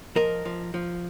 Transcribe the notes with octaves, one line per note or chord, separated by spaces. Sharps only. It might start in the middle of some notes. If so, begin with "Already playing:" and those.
F3 A#4 D#5
F3
F3